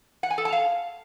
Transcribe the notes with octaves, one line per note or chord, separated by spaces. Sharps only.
F#5
G#5
A4
A5
F5